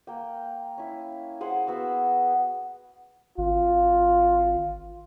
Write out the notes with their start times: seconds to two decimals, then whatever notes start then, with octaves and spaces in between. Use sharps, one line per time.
0.07 A#3 G5
0.78 C#4 E4
1.41 G#4 C5 F#5
1.67 B3 F#4 E6
3.38 G#1 F4